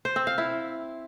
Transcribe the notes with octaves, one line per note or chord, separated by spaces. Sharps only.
C5
C4
F5
E4